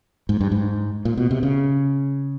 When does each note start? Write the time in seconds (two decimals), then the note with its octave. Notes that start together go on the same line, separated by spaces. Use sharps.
0.29 G#2
0.41 G2
0.52 G#2
1.05 A#2
1.18 B2
1.31 C3
1.43 C#3